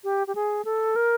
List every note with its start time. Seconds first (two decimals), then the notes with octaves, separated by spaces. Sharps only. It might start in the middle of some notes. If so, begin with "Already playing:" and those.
0.04 G4
0.27 G4
0.35 G#4
0.65 A4
0.96 A#4